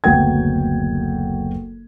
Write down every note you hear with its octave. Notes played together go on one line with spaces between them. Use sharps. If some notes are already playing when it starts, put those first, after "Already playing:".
F#1 D2 F#3 B3 G5 G#6